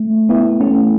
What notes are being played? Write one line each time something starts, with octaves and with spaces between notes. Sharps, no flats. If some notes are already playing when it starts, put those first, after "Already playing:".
Already playing: A3
B3 E4
A3 C#4